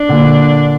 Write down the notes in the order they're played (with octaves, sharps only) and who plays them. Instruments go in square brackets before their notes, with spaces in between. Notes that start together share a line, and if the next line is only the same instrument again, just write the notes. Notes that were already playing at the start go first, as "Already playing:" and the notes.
Already playing: [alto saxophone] D4
[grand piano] A#2 D3